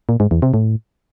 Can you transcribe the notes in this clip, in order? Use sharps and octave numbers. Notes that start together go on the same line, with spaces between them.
A#2
G#2
E2
C3
A2